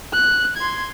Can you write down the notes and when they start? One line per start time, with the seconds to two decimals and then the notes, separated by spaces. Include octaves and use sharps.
0.14 F#6
0.57 C6 G#6